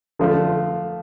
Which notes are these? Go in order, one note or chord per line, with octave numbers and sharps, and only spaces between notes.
D3 F3 A3